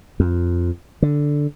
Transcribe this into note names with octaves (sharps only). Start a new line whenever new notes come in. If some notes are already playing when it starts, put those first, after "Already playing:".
F2
D3